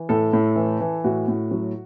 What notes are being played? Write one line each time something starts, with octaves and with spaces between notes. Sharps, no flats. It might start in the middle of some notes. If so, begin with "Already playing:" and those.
Already playing: E3
A2 A4
A2
E3
E3
A2 F#4
A2
F#3